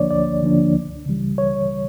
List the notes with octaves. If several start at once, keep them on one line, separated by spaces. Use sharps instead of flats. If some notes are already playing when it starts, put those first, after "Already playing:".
Already playing: D2 D3 F3 A#3 D4 C#5 D5
D2 D5
D3 F3 A#3 D4
C#2
C#3 E3 G3
C#5